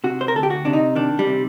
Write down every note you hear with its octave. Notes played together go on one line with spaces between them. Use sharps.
C3 F#4
C5
A#4
D2 A4
G4
F#4
C3 D4
D#4
D#3 D4
G3
C3